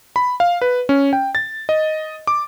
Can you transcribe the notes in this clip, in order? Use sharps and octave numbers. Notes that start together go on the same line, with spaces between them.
B5
F5
B4
C#4
G5
A6
D#5
D6